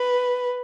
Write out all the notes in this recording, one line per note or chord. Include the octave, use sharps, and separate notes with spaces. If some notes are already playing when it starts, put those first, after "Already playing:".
Already playing: B4